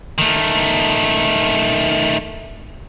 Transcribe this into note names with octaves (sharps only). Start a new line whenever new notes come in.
D#3 A3